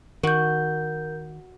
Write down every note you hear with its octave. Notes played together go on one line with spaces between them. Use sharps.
D#3 F#4 A#4 G6